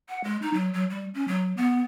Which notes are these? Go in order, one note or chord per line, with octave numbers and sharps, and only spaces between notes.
F#5
G#3
D#4
F#3
F#3
G3
C#4
F#3
B3